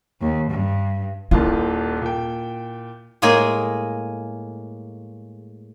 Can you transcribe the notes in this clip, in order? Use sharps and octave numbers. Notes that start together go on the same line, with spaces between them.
D#2
G2
D#1 D#2 E4 F4
A#2 G5
A2 G#3 A#3 G#4 G#5